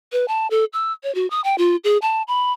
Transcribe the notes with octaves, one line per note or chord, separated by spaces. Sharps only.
B4
A5
A4
E6
C#5
F#4
D#6
G5
F4
G#4
A5
B5